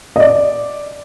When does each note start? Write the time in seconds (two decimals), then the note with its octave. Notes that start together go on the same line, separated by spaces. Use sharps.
0.16 D#5
0.20 D5